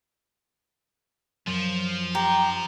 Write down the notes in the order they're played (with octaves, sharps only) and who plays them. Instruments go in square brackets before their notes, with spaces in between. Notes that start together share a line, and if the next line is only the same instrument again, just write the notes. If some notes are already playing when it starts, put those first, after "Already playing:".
[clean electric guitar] F#2 [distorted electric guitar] F3
[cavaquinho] G4 [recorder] A#5